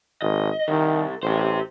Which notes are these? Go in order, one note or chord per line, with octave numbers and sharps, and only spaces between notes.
G#1 D#5
C2 D#3
A1 G4 C5